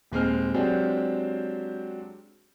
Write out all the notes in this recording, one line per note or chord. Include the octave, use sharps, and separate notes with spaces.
D#1 G#3 C4 F6
F#3 G#3 C4 D4 G4